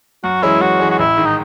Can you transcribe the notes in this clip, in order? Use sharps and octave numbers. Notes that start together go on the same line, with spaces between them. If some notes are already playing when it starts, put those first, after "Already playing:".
F#2 F#4
E3 G#3 C#4 E4
F#2 F#4
E3 G#3 C#4
F#4
A1 E4
G#2 D#3
D#4